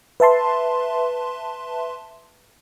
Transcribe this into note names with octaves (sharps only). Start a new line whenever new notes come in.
B4 E5 A5 C6